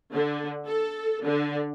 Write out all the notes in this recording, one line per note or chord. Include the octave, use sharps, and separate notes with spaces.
D3
A4
D3